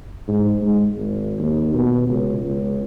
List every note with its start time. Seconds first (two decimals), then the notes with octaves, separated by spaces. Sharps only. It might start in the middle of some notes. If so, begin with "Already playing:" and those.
0.28 G#2
0.62 G#3
0.95 G#1
1.39 D#2
1.74 B2
2.08 C#2
2.44 C#2